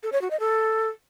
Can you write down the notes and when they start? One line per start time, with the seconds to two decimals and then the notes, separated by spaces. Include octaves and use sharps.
0.03 A4
0.12 C#5
0.22 F#4
0.31 D#5
0.40 A4